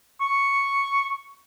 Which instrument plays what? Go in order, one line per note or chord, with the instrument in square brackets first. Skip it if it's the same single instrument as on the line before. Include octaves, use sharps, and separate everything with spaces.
[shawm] C#6